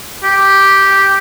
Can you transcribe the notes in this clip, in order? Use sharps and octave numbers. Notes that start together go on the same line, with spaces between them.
G4